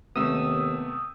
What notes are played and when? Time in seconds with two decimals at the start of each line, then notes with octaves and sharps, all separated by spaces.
0.16 D#2 C3 A3 B3 D#6 E6